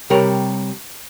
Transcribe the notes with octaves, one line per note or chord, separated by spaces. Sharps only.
C3 G3 A#4 C#5